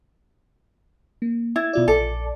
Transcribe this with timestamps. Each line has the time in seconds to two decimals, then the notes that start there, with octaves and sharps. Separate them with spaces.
1.22 A#3
1.56 E4 G#6 A6
1.73 B2 F4 D5
1.88 A#1 A4 D5 D6